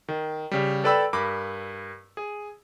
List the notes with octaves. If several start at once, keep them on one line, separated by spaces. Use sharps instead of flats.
D#3
C#3 G3
A4 B4 D5 G5 B5 E6
G2 A#4 B5 D6
G#4